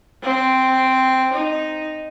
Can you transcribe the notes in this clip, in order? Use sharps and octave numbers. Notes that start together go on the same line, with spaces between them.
C4
D#4